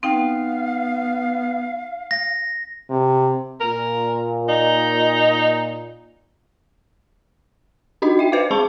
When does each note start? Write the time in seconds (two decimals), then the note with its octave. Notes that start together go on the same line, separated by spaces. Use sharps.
0.03 B3 C4 D#4 F5 G5
2.11 A#6
2.90 C3
3.60 A#2 A#4
4.49 D#4
8.02 D4 D#4 F#4 D#5
8.19 E5 G5
8.32 B4 C5 E5 F5 D6
8.51 G#3 G#4 A5 B5 C#6